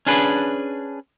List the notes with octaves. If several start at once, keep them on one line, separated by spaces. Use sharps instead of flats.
C#4 D4 G#4 B4